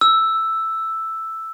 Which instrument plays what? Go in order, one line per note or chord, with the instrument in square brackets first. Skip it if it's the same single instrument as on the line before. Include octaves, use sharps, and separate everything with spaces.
[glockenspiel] E6